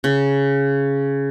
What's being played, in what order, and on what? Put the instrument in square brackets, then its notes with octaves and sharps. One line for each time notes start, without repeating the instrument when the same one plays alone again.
[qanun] C#3